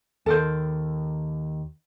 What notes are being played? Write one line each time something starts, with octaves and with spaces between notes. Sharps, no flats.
D#2 A4 A#4 C5